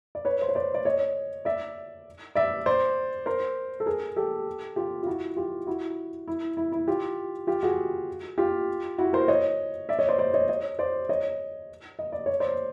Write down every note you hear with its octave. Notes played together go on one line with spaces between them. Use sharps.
D5
B4 C#5
C5
C#5
C5 D5
D5
C#5 D#5
D5 E5
D5 E5
C5 D5
A#4 C5
A4
G#4 A#4
G4 A4
F4 G4
F4
E4 F#4
F4 G4
E4 F#4
E4
E4
E4
F4 G4
F4 G4
F#4 G#4
F4 G4
E4 F#4
A#4 C5
C#5 D#5
D5 E5
C#5 D#5
C5 D5
C5 D5
C#5 D#5
C#5 D#5
C5 D5
C#5 D#5
D#5
D5
C#5
C5 D5